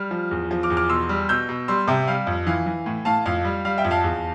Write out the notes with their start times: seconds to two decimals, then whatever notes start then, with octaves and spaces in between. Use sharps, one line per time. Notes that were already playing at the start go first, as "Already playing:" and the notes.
Already playing: G3 F6
0.11 F3
0.31 E2
0.51 F3
0.63 D6 F6
0.70 E2
0.77 D6 F6
0.89 B2 C6 E6
1.09 G3
1.29 B2 E6 G6
1.49 B2
1.68 G3 C6 E6
1.88 C3 E5 G5
2.07 G3 F5
2.27 F2
2.47 E3 F5
2.66 E3
2.86 A2
3.05 A2 F5 A5
3.26 F2 F5
3.45 G3
3.65 G3 F5
3.78 E5 G5
3.85 F2
3.91 F5 A5
4.04 E2